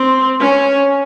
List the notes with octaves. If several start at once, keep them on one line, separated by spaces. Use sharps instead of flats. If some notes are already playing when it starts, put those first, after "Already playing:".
Already playing: C4
C#4